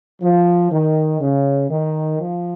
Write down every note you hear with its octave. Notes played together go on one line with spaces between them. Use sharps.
F3
D#3
C#3
D#3
F3